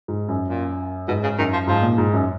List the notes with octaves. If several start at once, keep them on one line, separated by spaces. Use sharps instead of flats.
G#2
F#2
A#2
G#2 B2
C#3
F#2 D#3
F3
G#2 F3
A#2
G#2
F#2